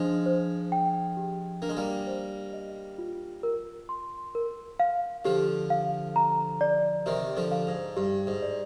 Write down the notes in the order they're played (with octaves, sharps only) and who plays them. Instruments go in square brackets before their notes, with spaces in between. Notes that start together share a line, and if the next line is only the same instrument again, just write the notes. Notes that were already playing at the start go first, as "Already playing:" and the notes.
Already playing: [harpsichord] F3 G#3 [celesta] D4
[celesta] C5
G5
G4
[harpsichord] A#3 [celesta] D4
[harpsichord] G#3
G3 A#3
[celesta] C5
D#5
F4
A#4
C6
A#4
F5
[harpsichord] D3 F3 [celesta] G4
[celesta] F5
A#5
D5
[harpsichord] C3 D#3 [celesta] G4
[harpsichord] D3 F3
[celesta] F5
[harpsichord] G#2
[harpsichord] G2 [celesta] G4
[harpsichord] G#2
[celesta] D5